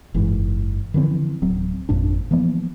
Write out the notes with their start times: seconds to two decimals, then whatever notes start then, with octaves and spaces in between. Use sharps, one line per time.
0.14 F#1 G#2 E3
0.94 D3 E3 F3 C4
1.42 D1 F#3 C4
1.89 G#1 F2 A#2 D4
2.31 E3 F3 A#3 B3